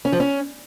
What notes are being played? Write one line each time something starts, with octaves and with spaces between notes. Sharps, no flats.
C#4
F3
C#4